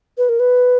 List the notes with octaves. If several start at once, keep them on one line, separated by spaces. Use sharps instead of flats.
B4
A#4
B4